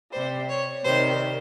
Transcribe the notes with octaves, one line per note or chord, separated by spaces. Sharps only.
C3 G3 C5
C#5
C3 D#3 G3 C5